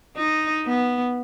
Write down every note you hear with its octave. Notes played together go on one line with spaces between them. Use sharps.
D#4
B3